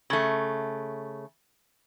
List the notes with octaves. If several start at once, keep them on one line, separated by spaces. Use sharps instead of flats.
C#3 A3